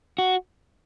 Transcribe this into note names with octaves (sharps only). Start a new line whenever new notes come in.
F#4